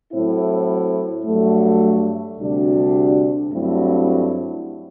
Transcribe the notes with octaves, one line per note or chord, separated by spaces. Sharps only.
A2 F#3 C4 E4
G2 F#3 A3
D2 C3 G3 D4 F#4
G2 F#3 A3 C4 E4